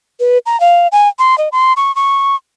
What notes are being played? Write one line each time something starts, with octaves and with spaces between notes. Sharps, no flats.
B4
A#5
F5
G#5
C6
D#5
C6
C#6
C#6